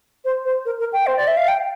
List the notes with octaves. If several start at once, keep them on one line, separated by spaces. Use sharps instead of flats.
C5
C5
A#4
A#4
G5
C5
D5
E5
F5
G5